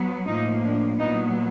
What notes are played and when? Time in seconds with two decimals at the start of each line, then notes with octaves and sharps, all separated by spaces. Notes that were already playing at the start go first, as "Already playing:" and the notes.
Already playing: F#3 B3
0.27 A2 F3 A#3 D#4
0.63 D4
0.98 A#2 F#3 B3 D#4